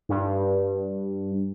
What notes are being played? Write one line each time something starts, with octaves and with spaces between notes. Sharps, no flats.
G2